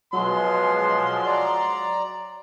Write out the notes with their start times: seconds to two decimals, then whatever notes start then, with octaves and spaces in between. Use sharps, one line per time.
0.13 B2 F3 F#3 G#3 C6
1.25 D5 A#5